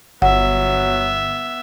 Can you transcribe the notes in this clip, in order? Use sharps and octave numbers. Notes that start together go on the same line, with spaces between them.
G1 F#3 B3 E5 F#5